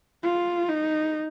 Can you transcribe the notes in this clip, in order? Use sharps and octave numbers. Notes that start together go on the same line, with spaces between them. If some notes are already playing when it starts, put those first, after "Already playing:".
F4
D#4